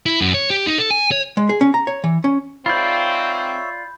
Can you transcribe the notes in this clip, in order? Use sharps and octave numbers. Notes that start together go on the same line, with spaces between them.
E4
F#2
C#5
G4
D#4
A4
G#5
C#5
G#3
G#4
C#4
A#5
C#5
E3
C#4
G#2 C4 F4 C#5 D5 E5 B5 G6